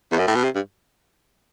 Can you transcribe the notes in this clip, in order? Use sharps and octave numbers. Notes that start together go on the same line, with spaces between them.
E2
F#2
A2
B2
C3
G2